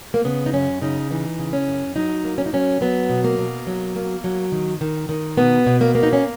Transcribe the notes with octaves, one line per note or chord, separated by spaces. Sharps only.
A#3
C#3 B3
D#4
F#2 C#4
C#3 D#4
E3 D#4
C#3
C#4
F#2
F#3 D#4
A#3
C#4
D#4
F#3 C#4
F#3 B3
B2
A#3
B2
F#3
A#3
F#3
D#3
D#3
D#3
B2 B3
B2
A#3
A#3
D#4
C#4